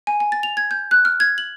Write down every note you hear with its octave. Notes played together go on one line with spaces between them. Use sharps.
G#5
G#5
A6
F7
G#6
G6
F#6
F6
G#6
F#7